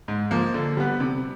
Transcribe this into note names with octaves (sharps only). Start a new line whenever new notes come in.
G#2
F3 A#3
D3
G3 B3
C3